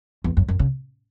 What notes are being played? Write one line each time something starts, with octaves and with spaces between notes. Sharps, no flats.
E2
F#2
F#2
C#3